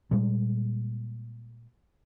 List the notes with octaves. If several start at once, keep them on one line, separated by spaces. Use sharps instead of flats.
A#2 G3 G#3